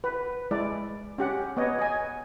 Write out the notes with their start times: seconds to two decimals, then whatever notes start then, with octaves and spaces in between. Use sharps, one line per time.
0.04 B4
0.51 G#3 E4 D5
1.18 C#4 G4 F#5
1.57 B3 C#5 D#5
1.79 D#5 G#5